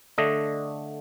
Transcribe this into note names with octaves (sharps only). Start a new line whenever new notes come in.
D3 A3 D4 D#5